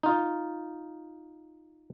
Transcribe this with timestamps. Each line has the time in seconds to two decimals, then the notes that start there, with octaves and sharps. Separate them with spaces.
0.03 D#4 F4